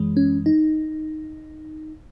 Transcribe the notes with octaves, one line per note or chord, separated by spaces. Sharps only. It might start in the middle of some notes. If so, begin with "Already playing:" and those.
Already playing: F#2 E3 G#3
C#4
D#4